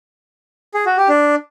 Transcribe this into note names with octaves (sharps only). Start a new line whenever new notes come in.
G#4
F#4
G4
D4